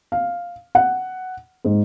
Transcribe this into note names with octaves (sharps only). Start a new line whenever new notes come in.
F5
F#5
G#2